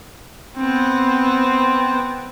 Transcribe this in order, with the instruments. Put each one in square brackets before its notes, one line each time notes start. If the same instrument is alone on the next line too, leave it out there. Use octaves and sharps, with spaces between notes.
[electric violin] B3 C4